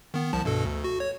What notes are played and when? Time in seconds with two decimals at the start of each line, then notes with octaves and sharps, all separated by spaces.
0.14 D#3 B3
0.33 C2 F3 A5
0.45 G2 B2 A4
0.65 D2
0.84 F#4
1.00 C#5